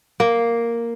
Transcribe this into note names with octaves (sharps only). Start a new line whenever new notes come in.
A#3